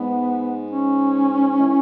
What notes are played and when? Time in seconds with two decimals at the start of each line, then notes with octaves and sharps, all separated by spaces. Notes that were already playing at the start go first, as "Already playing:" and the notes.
Already playing: G#2 B3
0.71 C#4
1.60 E3